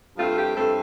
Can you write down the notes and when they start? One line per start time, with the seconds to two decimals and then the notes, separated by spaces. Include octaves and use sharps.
0.17 G2 F3 A3 C4 F4
0.37 G4
0.56 G2 F3 A3 C4 A4